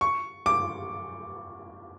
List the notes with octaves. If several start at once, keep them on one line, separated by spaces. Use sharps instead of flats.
C#6
D6